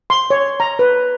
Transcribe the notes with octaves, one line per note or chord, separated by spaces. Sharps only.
C6
C#5
A#5
B4